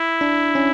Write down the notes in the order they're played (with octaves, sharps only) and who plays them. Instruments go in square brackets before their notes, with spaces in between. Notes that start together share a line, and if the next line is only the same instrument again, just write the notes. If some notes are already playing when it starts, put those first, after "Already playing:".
Already playing: [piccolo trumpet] E4
[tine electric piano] D4
C#4